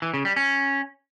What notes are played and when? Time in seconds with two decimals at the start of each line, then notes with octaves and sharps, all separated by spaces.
0.02 E3
0.14 C#3
0.25 G3
0.36 C#4